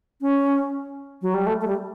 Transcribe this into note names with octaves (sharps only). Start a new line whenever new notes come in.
C#4
F#3
G3
A3
A3
G3